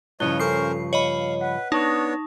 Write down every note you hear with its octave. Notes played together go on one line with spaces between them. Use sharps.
G2 C#3 F3 E4 C#5 D#5 F#6 G7
C#4 A4 A#4 C5 C#6 C7
C#5 D#5 F5 B5 F#7
B4 F#5
B3 D4 D#4 C#5 A5 C#6 D#6